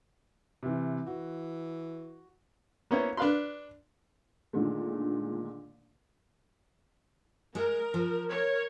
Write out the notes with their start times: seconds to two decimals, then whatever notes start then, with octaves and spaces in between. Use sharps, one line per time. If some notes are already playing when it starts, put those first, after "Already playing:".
0.63 C3 E3
1.06 E3 F#4
2.91 A#3 B3 C#4 E4 C5
3.17 D4 B4 F5 B5 C6
4.53 A#2 D3 D#3 G#3 A3
7.55 G#3 A#4
7.94 F3
8.29 A#4 C#5